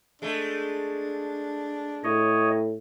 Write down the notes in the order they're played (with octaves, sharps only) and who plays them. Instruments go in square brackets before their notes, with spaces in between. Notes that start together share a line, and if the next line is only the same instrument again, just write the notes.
[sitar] G#3 A3 [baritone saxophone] D4
[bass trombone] A2 [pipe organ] C#5 D#5